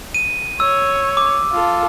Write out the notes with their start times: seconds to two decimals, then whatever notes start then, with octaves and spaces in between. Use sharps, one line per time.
0.14 D#7
0.60 C#5 E6
1.17 D6
1.52 F4 A4